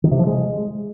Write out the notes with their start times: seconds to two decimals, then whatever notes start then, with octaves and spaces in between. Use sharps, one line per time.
0.04 D#3
0.11 C3
0.19 F3
0.27 G#3